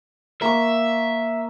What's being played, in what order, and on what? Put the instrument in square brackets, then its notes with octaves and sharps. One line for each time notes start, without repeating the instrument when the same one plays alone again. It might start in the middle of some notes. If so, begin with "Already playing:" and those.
[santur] A#3 C#6 [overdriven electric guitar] E5